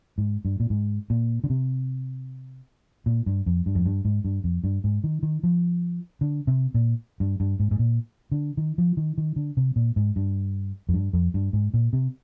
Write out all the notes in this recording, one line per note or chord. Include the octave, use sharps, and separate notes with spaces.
G#2
G2
A#2
G#2
A#2
D3
C3
A#2
G2
F2
G2
F2
G2
G#2
G2
F2
G2
G#2
D#3
D#3
F3
D3
C3
A#2
G2
G2
G#2
G#2
A#2
D3
D#3
F3
D#3
D#3
D3
C3
A#2
G#2
G2
F2
G2
F2
G2
G#2
A#2
C3